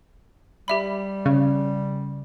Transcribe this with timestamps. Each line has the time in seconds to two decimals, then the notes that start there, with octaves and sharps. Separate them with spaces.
0.68 G3 G4 E5 B5
1.25 C#3